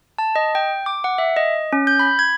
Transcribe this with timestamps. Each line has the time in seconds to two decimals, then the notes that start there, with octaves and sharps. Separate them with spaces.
0.18 A5
0.36 D#5
0.55 G5
0.86 D6
1.04 F#5
1.18 E5
1.36 D#5
1.73 C#4
1.87 G6
1.99 B5
2.19 G#6